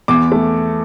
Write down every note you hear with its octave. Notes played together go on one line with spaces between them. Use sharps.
E2 D6
A3